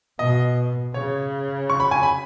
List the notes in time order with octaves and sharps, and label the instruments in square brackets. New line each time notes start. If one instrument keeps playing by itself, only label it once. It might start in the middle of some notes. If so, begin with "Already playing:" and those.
[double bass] B2 [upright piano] D#5
[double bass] C#3 [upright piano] C#5
[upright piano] C#6
B5
G#5
B5